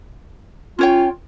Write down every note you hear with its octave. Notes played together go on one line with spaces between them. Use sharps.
C#4 F4 C#5 G5